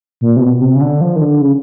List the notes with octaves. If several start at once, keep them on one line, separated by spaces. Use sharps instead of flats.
A#2
C3
B2
C3
C#3
D3
F3
D#3
D3
C#3